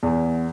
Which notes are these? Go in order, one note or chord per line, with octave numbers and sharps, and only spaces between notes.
E2